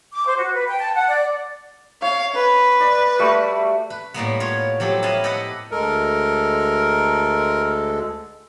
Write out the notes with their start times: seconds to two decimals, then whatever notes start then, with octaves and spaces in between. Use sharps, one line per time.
0.13 D6
0.27 C5
0.38 F#4
0.54 B4
0.68 G5
0.79 A5
0.95 F#5
1.08 D5
2.02 C#5 F5
2.34 B4
2.80 D5
3.19 G3 A3 F#4
3.90 B4
4.14 A2 G3 A#3 B3
4.40 F4 C#5
4.80 F3 F#3 G4 A4
5.03 E4 B4 D#5 F5 A5
5.24 G4 A4 B4 D#5 F#5
5.71 D2 G#3 A4 A#4